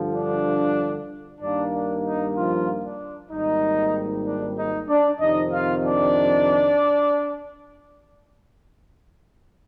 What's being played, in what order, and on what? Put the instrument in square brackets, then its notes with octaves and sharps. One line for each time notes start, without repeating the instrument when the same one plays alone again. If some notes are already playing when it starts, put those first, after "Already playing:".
Already playing: [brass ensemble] G2 D3 F3
D4
G2 D#3 A#3 D4
D4
D#4
F3 F4
D4
G#1 G#2 G3 A#3 D#4
D4
D#4
D4 D5
F2 C3 D#3 D#4 D#5
F4 F5
D4 D5